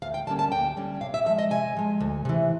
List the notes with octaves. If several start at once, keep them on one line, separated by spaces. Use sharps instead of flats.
D2 F5
G5
D3 G3 A#3 C#4 A5
A5
D2 G5
D3 G3 A#3 C#4
C3 F5
E5
F3 G#3 E5
D#5
C3 G#5
F3 G#3
D2
C3 E3